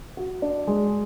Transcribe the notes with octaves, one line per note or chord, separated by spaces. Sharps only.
F#4
D4
G#3